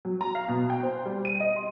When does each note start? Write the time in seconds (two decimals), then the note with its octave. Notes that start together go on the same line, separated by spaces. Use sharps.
0.05 F#3
0.21 A#5
0.35 F5
0.48 B2
0.70 G5
0.83 C5
1.06 G3
1.25 D#7
1.40 D#5
1.56 C6